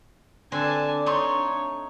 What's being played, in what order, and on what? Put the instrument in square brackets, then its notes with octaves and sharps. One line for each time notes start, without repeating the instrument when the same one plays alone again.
[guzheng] D3 C4 [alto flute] D4 [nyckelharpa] G#5 A5
[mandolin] A3 C6 C#6 [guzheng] D#4 [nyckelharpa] C#5